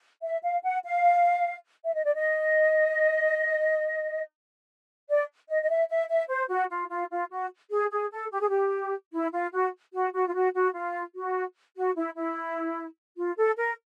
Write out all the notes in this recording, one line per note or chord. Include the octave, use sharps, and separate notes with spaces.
E5
F5
F#5
F5
E5
D#5
D5
D#5
D5
D#5
D#5
E5
E5
E5
C5
F#4
F4
F4
F4
F#4
G#4
G#4
A4
G4
G#4
G4
E4
F4
F#4
F#4
F#4
F4
F#4
F#4
F4
F#4
F#4
E4
E4
F4
A4
A#4